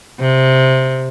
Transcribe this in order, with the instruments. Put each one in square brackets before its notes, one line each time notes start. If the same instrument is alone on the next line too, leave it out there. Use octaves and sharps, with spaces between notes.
[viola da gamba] C3